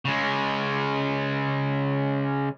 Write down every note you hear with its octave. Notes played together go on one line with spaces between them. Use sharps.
C#3 G#3